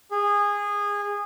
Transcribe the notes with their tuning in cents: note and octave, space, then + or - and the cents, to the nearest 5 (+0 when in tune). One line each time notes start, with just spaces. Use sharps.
G#4 -20